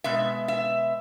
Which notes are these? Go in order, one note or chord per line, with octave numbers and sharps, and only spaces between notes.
B2 G#3 E5
E5